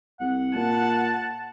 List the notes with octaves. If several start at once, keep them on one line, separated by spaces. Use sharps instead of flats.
C2 F#5
A#2 A5